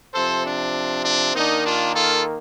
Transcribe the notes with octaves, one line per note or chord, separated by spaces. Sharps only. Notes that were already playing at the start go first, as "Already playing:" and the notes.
C3 F3 C4 A4 C5
D4
D4
D#3 A#3 D4 D#4
D4 F4
F4 A4